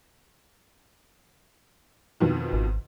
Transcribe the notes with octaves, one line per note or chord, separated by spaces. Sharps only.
F2 B2 D#3
G#1